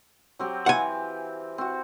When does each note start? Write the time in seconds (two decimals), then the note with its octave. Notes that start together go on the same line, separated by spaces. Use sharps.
0.39 F#3 C4 G4
0.66 E3 F5 F#5 G#5
1.58 C4 F#4